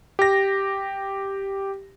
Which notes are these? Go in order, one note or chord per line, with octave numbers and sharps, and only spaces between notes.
G4 A#6